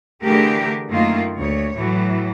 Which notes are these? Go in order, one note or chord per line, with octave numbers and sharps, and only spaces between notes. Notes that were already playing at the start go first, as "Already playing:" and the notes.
D3 E3 A3 G4 G#4 A#4
F#2 D#3 A3 A#3 F4
D2 C#5
A2 E3 F#3